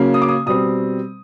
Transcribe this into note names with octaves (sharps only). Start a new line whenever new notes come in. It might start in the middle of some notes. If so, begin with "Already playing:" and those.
Already playing: C#3 F#3 A#3
D#6
D6
D#6
B2 G3 C4 D#6